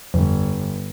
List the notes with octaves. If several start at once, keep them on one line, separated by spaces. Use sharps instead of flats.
G1 F2